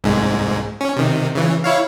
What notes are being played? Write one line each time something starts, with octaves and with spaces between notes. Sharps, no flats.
C2 G#2 G#3
C#4
C3 D#3
C#3 E3
E4 C#5 F5